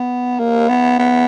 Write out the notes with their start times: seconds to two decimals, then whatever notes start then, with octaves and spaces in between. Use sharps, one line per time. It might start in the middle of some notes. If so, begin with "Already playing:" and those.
Already playing: B3
0.39 A#3
0.69 B3
0.99 B3